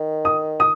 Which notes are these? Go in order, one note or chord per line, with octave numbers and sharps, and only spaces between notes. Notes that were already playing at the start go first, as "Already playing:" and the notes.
Already playing: D#3
D#6
D#6